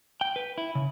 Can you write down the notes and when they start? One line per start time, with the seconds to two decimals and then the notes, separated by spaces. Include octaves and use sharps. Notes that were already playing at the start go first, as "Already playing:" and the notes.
0.21 G5
0.36 B4
0.58 E4
0.75 C#3